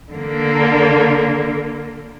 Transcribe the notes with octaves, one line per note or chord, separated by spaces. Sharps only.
D3 A#3